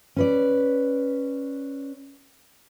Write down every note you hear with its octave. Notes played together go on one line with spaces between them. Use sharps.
C#4 B4 D5